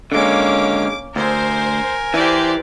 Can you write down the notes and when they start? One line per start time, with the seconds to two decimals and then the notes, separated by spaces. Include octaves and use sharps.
0.12 D3 G#3 A#3 C#4 D6
1.16 D2 A#4 C5 G#5
2.14 E3 G4 C5 D5